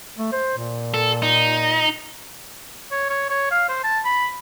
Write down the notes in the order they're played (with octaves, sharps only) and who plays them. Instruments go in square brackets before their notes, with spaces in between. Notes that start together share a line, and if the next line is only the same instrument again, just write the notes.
[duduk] A3
C5
A#2
[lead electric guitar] A4
D#4
[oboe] C#5
C#5
C#5
F5
C5
A5
B5